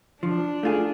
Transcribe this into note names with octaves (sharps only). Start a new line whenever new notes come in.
F3 D4
A3 F4 G#4